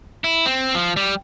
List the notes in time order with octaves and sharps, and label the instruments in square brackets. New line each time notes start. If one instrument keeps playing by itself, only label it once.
[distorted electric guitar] E4
C4
F3
G3